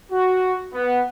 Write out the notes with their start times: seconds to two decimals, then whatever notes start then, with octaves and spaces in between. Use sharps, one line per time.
0.12 F#4
0.73 B3